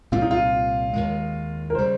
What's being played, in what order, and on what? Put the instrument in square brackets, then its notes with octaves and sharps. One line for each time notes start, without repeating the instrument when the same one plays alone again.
[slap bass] C2 A#2 G3 C4 [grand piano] F4
[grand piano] D#4
F4
[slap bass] D#2 D#3 G#3
[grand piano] A#4
[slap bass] C#3 G3 [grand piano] C5